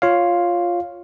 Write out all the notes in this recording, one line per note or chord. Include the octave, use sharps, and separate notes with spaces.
F4 C#5 F5